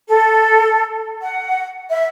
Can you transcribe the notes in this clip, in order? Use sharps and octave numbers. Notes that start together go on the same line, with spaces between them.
A4
F#5
E5